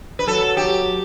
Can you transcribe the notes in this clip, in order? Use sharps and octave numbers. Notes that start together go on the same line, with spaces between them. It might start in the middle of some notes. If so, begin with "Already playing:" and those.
B4
F#3 A4
G4